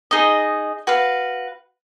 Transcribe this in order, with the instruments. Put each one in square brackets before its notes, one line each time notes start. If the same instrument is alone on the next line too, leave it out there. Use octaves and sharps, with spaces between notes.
[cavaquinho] D#4 G#4 D#5
F#4 B4 F5